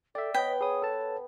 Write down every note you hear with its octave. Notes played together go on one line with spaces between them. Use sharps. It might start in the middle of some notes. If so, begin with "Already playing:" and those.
A4 D5 E5 G5
B3 C#5 D#5 G5 B6
G#4 C#5 B5 D#6
A4 B4 A5